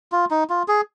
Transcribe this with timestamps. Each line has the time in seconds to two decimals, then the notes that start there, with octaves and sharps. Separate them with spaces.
0.12 F4
0.30 D#4
0.50 F4
0.68 G#4